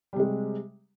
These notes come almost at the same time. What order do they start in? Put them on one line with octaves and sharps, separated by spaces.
G3 C3 G#3